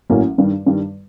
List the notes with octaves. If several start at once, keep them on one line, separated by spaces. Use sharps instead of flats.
A1 A2 F#3 A#3 C#4
G2 D#3 G3
G2 D#3 G3